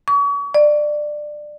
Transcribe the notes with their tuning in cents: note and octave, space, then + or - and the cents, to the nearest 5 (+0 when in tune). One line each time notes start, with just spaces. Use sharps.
C#6 +40
D5 +20